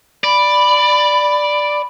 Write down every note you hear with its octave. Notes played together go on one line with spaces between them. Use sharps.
D5 B5